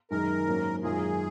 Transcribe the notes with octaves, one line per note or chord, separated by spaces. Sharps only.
F#2 D#3 G#3 D#4 G#4 A#4
G#2 F#3 A#3 C#4
F#2 D#3 G#3 C#4 F4 G#4